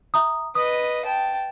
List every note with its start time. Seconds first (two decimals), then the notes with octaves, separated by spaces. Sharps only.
0.14 E5 A#5 D#6
0.55 B4 D#5 D#6
1.05 G5 A5